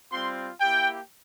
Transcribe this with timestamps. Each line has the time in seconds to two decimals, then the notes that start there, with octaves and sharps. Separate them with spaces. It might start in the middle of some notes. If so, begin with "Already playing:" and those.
0.12 G3 C4 F4 C6
0.60 A#3 E4 G4 G5